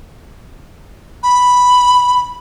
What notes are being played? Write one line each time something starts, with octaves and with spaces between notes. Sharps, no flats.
B5